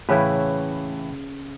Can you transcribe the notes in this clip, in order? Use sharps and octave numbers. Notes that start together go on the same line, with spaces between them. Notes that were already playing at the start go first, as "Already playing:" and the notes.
A2 C#3 E3 E4 B4